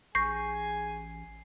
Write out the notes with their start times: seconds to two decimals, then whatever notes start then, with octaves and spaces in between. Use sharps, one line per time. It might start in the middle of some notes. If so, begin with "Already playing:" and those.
0.15 A1 G#4 G#5 C#6 G6 A#6 C7